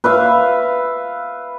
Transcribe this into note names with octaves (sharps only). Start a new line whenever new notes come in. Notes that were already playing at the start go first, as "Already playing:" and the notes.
B4 E5 F5